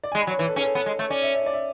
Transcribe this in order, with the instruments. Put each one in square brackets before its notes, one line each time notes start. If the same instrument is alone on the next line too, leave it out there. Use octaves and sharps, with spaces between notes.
[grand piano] D5
G#5
[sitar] G#3
[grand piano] B5
[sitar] F#3
[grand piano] C#5
[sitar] E3 [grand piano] B4
[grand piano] A4
[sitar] C#4 [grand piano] G#4
[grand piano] A4
[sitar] B3
G#3
[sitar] A3 [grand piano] C#5
[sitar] C#4 [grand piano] D5
[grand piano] E5
E5
D5
E5